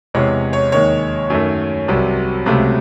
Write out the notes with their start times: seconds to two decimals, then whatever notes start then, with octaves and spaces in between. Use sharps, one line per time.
0.14 E2 C3 E3 G#3 C#5
0.53 C#5
0.72 D#2 D#3 G#3 C#5
1.30 F#2 D#3 A3
1.88 C2 C3 F#3
2.46 C#2 C3 F#3 A3